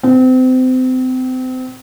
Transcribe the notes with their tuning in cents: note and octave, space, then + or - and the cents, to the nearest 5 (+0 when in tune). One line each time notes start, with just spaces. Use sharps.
C4 -30